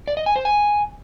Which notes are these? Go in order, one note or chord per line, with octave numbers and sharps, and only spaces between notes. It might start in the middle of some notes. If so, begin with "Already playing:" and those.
D5
D#5
G#5
C5
G#5